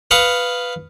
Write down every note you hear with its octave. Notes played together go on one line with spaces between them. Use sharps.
B4 F5 C#6 D#6